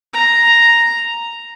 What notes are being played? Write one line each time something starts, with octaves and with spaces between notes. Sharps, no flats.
A#5